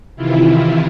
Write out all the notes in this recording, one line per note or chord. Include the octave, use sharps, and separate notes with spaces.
C3 D#3 E3 E4 F4